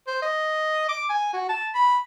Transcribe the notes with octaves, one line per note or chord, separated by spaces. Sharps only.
C5
D#5
D6
G#5
F#4
A5
B5